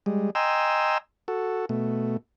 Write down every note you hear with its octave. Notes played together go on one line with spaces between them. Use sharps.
G3 G#3
D#5 G5 G#5 A#5 C6 E6
F#4 A4
B2 A3